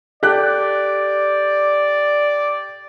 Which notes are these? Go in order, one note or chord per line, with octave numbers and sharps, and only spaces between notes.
G4 A4 D5 F#6